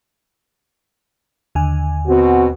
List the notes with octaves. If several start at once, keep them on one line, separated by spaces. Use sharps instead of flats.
D#2 D3 G#5
B2 C4 F#4